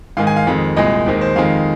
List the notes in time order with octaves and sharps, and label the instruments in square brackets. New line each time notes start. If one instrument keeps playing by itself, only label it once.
[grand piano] G#2 D#3 G#3 F5
G#5
F5
F2 D#3 G#3
C2 A#2 G#3 D#5
D#2 D#3 G#3 C4
C5
F2 D#3 G#3 F5